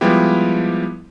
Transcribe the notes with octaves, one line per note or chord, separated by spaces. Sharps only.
F3 G3 G#3 B3 E4 G4